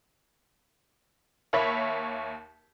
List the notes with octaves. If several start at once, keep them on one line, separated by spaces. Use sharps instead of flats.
D#2 A#3 C#5 E5 B5 B6